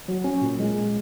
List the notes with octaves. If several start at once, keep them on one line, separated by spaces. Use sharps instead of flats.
F#3
C#4
A#2
G#3